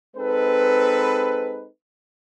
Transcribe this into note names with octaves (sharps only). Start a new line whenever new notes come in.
G#3 C4 D#4 A4 B4